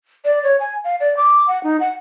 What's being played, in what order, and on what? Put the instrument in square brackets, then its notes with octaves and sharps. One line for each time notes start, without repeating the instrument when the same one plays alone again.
[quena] D5
C#5
G#5
F5
D5
D6
F#5
D#4
F#5